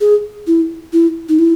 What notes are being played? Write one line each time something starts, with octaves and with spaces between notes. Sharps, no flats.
G#4
E4
E4
D#4
E4